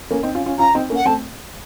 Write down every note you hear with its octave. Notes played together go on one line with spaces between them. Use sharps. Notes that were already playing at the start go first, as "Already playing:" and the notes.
A#3 C#4
C4 D#4
C#4 F4
C#4 F4
C#4 F4 A#5
C4 D#4
A#3 C#4
F#5
A3 C4 A5